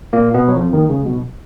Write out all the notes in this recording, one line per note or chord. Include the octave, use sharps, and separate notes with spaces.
A#2 A#3
B2 B3
F#3
F2 F3
D#2 D#3
C#2 C#3
B1 B2